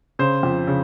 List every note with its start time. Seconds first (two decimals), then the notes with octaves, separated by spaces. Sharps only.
0.19 C#3 C5
0.43 F2
0.67 C#3